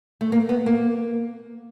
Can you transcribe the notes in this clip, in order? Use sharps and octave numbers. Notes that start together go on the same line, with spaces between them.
A3
A#3
B3
A#3